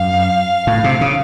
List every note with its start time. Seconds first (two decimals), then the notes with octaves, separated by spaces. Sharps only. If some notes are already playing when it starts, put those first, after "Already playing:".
Already playing: F#2 F5
0.67 A2
0.84 C3
1.01 C#3